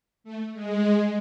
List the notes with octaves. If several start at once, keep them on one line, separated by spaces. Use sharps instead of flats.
A3
G#3
G#3